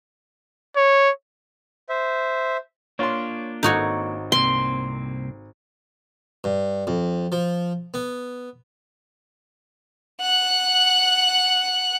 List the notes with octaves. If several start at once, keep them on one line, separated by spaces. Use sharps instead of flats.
C#5
C5 E5
A#3 D4 F4 C#5 C6
G#1 D#4 F#4 A4 C#5
C2 A#3 C4 C6
G2
F2
F3
B3
F#5 F#6